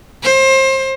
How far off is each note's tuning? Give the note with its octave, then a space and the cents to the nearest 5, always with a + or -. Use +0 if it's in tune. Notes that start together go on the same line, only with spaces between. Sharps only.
C5 +30